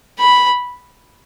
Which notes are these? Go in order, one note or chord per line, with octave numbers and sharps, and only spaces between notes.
B5